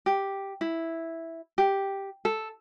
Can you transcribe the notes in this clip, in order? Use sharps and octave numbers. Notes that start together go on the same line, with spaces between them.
G4
E4
G4
A4